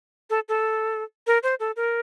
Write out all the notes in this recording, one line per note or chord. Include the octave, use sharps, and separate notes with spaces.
A4
A4
A#4
C5
A4
A#4